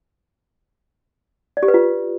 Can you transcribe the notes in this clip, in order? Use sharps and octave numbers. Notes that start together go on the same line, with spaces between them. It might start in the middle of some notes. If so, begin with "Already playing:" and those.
D5
G4
B4
F4